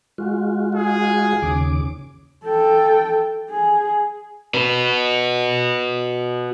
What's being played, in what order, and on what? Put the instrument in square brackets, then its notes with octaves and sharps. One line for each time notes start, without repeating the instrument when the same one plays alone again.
[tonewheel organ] G#3 F4 F#4
[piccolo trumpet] G#4
[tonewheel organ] D#2 C#3 D6
[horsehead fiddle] A4 G5
G#4
[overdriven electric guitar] F#4 B4